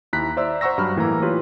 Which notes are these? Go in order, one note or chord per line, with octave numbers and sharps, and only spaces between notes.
D#2 E4 A#5 F#6 B6
C5 D5 E5 A#5 E6
C5 F#5 A#5 C#6 E6 A#6
G2 F#3 B5 F6
A2 E3 A#3 A#5
F4 G4 B4 C#5